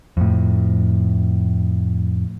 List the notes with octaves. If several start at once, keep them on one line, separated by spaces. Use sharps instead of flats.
F2 A2